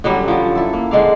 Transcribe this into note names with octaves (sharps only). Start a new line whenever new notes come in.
D3 F#3 G3 C#4
F3 F#3
E4 A4
A#3
D3 G#3 D5 F5